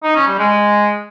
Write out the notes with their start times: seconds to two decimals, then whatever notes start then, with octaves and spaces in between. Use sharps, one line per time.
0.03 D#4
0.15 C#4
0.27 G3
0.39 G#3